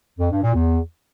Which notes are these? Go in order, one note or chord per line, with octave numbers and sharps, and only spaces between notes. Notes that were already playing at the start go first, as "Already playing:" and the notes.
F2
G2
A#2
E2